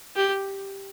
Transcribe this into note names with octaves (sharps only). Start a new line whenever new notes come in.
G4